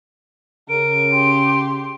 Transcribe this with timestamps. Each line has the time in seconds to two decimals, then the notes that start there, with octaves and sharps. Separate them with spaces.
0.69 C#3 A#4 D7
1.12 G4 C6